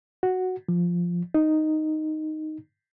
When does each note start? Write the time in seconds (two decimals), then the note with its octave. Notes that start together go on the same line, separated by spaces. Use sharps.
0.23 F#4
0.68 F3
1.34 D#4